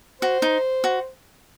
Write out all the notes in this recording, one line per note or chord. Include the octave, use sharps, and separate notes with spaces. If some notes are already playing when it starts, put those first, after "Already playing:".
F#4 C5
D#4
F#4